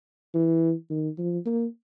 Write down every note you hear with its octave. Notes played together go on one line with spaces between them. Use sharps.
E3
D#3
F3
A#3